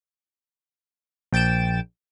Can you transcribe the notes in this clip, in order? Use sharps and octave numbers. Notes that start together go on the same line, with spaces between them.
A#1 G5 A6 D7 E7